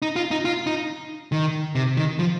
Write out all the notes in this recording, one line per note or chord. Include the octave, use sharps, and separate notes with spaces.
D#4
F4
D#4
F4
D#4
D#3
C3
D#3
F3